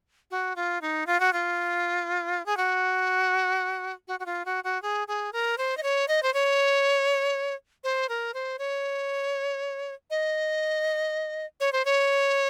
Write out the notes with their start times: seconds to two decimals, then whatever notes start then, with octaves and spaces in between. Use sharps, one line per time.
0.31 F#4
0.56 F4
0.81 D#4
1.07 F4
1.20 F#4
1.33 F4
2.46 G#4
2.57 F#4
4.08 F#4
4.20 F#4
4.26 F4
4.45 F#4
4.64 F#4
4.82 G#4
5.08 G#4
5.33 A#4
5.58 C5
5.77 D#5
5.83 C#5
6.08 D#5
6.23 C5
6.34 C#5
7.84 C5
8.09 A#4
8.34 C5
8.59 C#5
10.10 D#5
11.60 C#5
11.72 C5
11.85 C#5